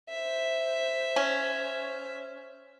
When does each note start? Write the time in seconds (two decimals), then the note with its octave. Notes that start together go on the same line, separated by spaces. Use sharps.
0.10 C5 E5
1.16 C#4